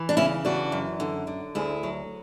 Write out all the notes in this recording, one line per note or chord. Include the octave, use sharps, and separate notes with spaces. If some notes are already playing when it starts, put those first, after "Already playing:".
Already playing: E3
D4
C#3 C#4 E4
E3 D4 F#4
F#2
D3
D3
D2 E4 G#4
F#3